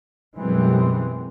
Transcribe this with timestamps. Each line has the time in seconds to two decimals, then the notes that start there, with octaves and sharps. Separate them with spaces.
0.37 F#2 B2 E3 G3 G#3 C4